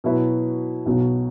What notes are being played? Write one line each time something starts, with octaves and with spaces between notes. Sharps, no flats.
B2 F#3 E4 B4
B1 B2 F#3